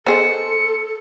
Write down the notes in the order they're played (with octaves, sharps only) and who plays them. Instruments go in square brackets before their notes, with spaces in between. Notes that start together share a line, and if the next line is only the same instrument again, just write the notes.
[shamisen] B3 G#4 D#5 [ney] A4 [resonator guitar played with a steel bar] C5 [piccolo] C#7